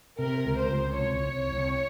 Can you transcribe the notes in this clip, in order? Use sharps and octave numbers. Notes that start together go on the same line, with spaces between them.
C3 A#4
C#2
C5
C#2
C2 C#5
C2
C2